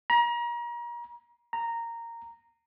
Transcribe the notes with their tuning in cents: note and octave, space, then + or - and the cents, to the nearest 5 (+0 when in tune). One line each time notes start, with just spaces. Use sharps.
A#5 +35
A#5 -10